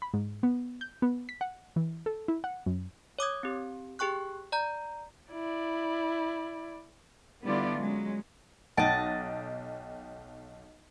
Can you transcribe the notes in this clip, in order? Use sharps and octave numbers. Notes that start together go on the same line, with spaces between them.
B5
G#2
B3
G6
B3
B6
F#5
E3
A4
E4
F#5
F#2
C#5 D6 D#6 G#6
C4 G4
G4 G#4 G5 C#6 F#6
D5 A#5 G6
E4 D5
D3 G3 B3 E4 F4 D5
F#3 G#3 C#4
B1 D#5 F#5 G5 A5 D7